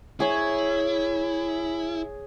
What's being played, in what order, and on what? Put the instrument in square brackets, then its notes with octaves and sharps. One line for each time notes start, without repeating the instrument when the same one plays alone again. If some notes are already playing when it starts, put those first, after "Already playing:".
[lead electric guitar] E4 [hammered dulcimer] G#4 C#5